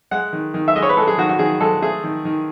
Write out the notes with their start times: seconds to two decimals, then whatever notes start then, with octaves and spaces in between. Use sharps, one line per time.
0.11 G#3 F#5
0.33 D#3
0.54 D#3
0.68 E5
0.76 G#3 D#5
0.82 C#5
0.89 B4
0.97 G#3 A4
1.07 G#4
1.18 D#3 F#4
1.29 F#4
1.39 D#3 G#4
1.61 G#3 A4
1.82 A3 G#4
2.04 D#3
2.25 D#3